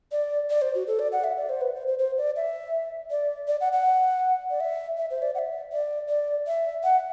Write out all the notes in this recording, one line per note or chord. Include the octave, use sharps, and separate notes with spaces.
D5
D5
C5
F#4
A4
D5
F#5
E5
D5
C5
B4
C5
C5
C5
D5
E5
D5
D5
F#5
F#5
D5
E5
E5
C5
D5
F#5
E5
D5
D5
E5
F#5